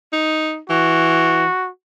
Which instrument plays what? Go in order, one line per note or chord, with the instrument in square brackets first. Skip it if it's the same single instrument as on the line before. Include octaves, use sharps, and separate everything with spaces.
[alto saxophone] D#4
[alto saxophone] E3 [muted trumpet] F#4